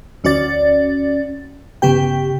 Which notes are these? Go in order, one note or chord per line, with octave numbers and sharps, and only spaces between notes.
D2 C#4 F#4 D5 A6
G1 C#3 B3 G4 G5